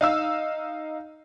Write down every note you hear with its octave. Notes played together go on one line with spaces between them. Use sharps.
D#4 F5 E6